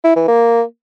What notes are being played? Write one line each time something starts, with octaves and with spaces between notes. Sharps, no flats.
E4
E3
A#3